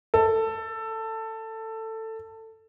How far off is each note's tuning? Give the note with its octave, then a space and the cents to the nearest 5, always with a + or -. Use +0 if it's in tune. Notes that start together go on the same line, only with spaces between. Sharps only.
A4 +15